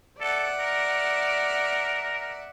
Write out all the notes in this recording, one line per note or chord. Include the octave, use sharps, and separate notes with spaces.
A4 D5 E5 F#5
A#4